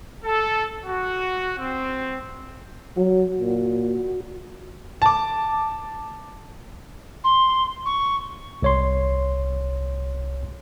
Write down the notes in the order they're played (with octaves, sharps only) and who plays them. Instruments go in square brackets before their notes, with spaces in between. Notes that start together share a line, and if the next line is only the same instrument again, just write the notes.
[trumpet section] A4
F#4
C4
[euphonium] F#3 [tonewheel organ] F#4
[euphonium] A#2
[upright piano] A5 D6
[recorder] C6
C#6
[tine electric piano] C2 C#5 C6